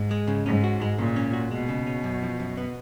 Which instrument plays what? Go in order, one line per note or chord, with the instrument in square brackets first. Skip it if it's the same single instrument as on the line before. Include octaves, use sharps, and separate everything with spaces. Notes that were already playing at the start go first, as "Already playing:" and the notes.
Already playing: [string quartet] G#2
[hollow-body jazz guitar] G#3
C#3
[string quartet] G#2 [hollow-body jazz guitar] C#4
[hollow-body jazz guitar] F#4
G#3
[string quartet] A#2 [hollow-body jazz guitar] C#3
[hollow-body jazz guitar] C#4
F#4
[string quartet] B2 [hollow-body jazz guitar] G#3
[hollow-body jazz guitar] C#3
C#4
F#2
F3
F#2
B3